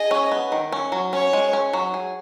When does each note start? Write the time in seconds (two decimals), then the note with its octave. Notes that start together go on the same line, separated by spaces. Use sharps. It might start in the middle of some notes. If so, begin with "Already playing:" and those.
Already playing: G#4 D#5
0.11 C#4
0.32 B3
0.52 D#3
0.72 C#4
0.92 F#3
1.13 C#4 C#5
1.33 G#3
1.53 C#4
1.73 F#3
1.94 G#4